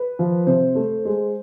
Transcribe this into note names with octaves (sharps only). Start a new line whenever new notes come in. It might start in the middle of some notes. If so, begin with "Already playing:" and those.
Already playing: B4
F3
C3 C5
A3
G#3